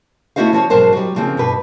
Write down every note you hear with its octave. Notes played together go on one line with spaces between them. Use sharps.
A3 B3 E4 F#4 C5 F5
F3 F#4 C#5
G#2 B2 F#3 A#4 C5 A5
F#3 G3
C#3 F3 A#3 C4
G2 B2 B4